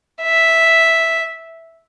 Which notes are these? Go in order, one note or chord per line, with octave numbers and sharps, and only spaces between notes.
E5